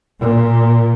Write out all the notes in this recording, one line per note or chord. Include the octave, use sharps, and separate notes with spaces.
A#2